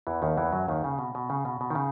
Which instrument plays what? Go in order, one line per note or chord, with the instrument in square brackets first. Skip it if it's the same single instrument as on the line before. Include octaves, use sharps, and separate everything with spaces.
[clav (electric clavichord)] E2 E3
D#2 D#3
E2 E3
F#2 F#3
D#2 D#3
C#3
B2
B2
C#3
B2
B2
D#3
C#3